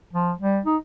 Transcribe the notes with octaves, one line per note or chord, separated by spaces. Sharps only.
F3
G3
D#4